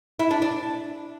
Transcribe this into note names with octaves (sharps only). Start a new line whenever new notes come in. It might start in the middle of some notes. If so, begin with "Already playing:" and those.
E4
D4
D4